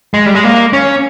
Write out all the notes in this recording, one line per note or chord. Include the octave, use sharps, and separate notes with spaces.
G#3
G3
G#3
A#3
C#4